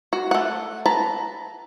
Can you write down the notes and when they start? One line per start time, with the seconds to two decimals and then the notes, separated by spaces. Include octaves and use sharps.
0.13 F#4
0.31 A3 F#5
0.86 B4 A5 A#5